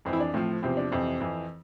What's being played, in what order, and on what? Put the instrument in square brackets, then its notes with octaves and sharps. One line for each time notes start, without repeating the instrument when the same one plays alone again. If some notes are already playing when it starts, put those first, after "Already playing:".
[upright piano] F2 E3 C4
E4
D4
A2 F3 C4
E2 C3 F3 C4
D4
F2 C3 E3 C4
F2 E3